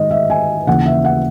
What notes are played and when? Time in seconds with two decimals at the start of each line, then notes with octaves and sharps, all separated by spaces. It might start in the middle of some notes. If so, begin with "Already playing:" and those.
Already playing: G#2 D#3 D#5
0.11 E5
0.30 G#5
0.67 D#2 C#3 E3 F#5
0.86 E5
1.04 F#5